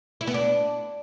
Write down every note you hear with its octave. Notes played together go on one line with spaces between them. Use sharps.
E4
B3
D4